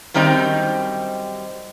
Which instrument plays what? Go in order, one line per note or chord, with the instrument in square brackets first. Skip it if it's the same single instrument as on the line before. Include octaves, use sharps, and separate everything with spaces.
[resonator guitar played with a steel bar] F#2 D#3 G3 C4 D#4